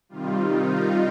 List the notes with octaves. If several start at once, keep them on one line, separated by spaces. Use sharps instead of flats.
C3 D#3 G3 F4
D#4
F4